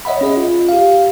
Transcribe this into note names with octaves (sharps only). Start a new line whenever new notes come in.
C#5 D#5 E5 F#5 B5
C#4 G#4 D#5
F4
G4 F5